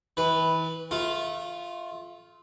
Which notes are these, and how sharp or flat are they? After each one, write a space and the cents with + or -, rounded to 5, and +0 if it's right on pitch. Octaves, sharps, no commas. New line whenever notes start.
E3 -35 B4 +0
A3 -25 F4 +0